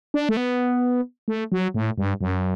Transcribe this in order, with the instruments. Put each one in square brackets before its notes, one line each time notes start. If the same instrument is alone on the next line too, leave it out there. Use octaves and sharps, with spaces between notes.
[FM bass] D4
A3
B3
A3
F#3
A2
G2
F#2